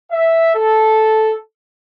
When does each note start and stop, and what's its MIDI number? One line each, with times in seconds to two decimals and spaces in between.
0.11 0.55 76
0.55 1.35 69